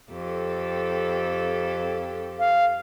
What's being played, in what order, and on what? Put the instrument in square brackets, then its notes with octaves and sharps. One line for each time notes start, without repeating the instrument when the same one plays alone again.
[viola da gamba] F2 G4 A4
[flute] F5